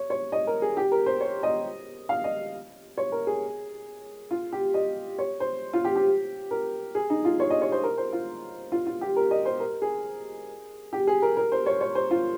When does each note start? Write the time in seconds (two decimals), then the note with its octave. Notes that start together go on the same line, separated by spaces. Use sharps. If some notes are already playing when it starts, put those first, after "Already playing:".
Already playing: C#5
0.10 C#5
0.32 D#5
0.47 A#4
0.62 G#4
0.77 G4
0.92 A#4
1.06 C5
1.20 C#5
1.43 D#5
2.09 F5
2.24 D#5
2.98 C#5
3.12 A#4
3.27 G#4
4.31 F4
4.52 G4
4.74 D#5
5.19 C#5
5.40 C5
5.73 F4
5.85 G4
5.96 G4
6.51 A#4
6.95 G#4
7.10 D#4
7.25 F4
7.40 C#5
7.50 D#5
7.62 C#5
7.72 C5
7.83 A#4
7.98 C5
8.13 F4
8.72 F4
8.86 F4
9.01 G4
9.16 A#4
9.31 D#5
9.46 C5
9.60 A#4
9.82 G#4
10.93 G4
11.07 G#4
11.22 A#4
11.37 A#4
11.52 C5
11.66 C#5
11.81 C#5
11.95 C5
12.11 F4